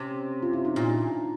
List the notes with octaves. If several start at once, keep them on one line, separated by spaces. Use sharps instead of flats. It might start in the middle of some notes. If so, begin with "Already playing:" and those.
Already playing: C3 C#4
F4
E4
D#4
A#2 D4